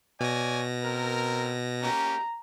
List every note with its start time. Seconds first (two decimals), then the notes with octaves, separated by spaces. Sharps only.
0.21 B2 C#5 D5 G#5 A#6
0.83 C4 A#4
1.82 A#3 C#4 G4 A#5